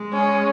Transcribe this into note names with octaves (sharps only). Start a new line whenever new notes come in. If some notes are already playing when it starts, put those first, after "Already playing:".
Already playing: G#3
C#4